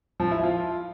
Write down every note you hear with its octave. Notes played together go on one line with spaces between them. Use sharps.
F3
E4
F4